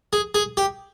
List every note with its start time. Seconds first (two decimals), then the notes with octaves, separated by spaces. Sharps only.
0.13 G#4
0.35 G#4
0.57 G4